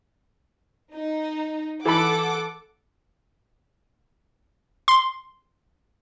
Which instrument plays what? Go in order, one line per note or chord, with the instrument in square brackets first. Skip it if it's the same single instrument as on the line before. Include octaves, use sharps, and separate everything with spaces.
[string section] D#4
[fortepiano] E3 B5 [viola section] A4 [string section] F#5 D6
[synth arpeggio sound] C6